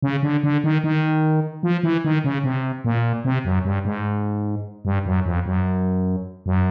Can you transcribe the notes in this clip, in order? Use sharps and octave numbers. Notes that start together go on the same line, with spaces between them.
C#3
D3
D3
D#3
D#3
F3
E3
D#3
C#3
C3
A#2
C3
F#2
G2
G#2
G2
F#2
F2
F#2
F#2